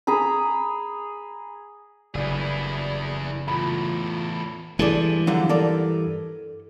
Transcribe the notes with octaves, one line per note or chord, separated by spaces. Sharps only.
G#4 A#5 B5
F#1 G2 E4 G#4 D5
E2 A2 F4 B5
G2 E3 G#3 A4 D5
D3 F3 F#3
A4 A#4 D5